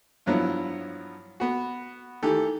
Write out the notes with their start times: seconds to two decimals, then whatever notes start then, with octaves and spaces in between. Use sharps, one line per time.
0.26 G2 F3 F#3 B3 E4
1.40 B3 F#4
2.23 D#3 E3 A3 G4 A4